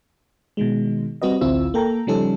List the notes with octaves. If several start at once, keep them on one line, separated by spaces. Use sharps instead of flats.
B2 D#3 G#3
G3 C4 F#4 B4 D#5
A1 D2 C4 E4 F4 E6
A#3 A4 G5 A#5
C#3 F3 G3 C#4 D#4 A4